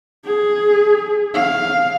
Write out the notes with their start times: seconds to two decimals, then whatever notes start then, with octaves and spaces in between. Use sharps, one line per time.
0.25 G#4
1.34 F5